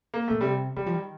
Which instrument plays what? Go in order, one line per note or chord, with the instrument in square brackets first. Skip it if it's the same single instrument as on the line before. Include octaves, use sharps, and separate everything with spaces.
[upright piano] A#3
[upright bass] A#2 [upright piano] A3
[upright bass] C3 [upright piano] G3
[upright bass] D3 [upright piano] G3
[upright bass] F3
D#3